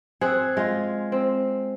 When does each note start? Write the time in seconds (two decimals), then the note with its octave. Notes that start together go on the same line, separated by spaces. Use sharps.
0.21 C4 G#4 F#5
0.57 G#3 F4
1.12 C4